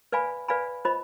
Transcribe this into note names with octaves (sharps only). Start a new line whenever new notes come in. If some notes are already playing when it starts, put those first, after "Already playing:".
B4 D5 F5 G#5 B5
B4 D5 F5 G#5 B5
F4 C5 D#5 B5